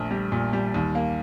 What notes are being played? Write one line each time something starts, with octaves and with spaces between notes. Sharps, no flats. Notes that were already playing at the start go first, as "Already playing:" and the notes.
Already playing: A#1 A3
G3
A#2
G3
D#2
A#3